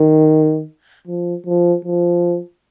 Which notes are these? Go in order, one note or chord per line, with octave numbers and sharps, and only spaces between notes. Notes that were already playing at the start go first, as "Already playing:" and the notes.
Already playing: D#3
F3
F3
F3